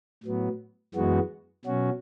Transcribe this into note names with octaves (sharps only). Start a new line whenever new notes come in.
A2 F#3 B3
F#2 E3 G#3 B3 F#4
B2 F#3 C#4 F#4